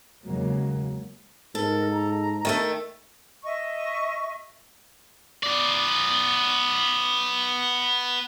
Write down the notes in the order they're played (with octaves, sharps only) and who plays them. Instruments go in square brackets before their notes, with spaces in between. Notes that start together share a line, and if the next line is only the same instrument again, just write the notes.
[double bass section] E2 C#3 F#3 G#3 A#3
[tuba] G#2 [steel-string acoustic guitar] A4 [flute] A#4
[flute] A#5
[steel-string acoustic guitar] D#3 A3 A4
[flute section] D#5 E5 C#6
[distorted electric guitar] B3 D5